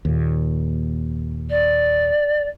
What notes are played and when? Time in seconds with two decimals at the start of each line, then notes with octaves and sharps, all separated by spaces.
0.05 D#2 A#2
1.49 D5